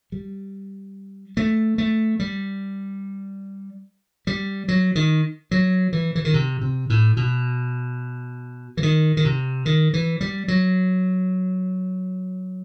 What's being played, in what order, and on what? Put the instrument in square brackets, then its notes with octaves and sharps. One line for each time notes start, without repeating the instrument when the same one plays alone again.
[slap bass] G3
A3
A3
G3
G3
F#3
D#3
F#3
E3
E3
D#3
C3
C3
A2
B2
E3
D#3
D#3
C3
D#3
E3
G3
F#3